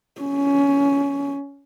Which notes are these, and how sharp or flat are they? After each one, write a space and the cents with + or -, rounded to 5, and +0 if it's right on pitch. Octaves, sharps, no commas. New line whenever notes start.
C#4 +20